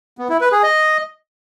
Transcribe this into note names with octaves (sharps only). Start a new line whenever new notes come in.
B3
E4
B4
G#4
D#5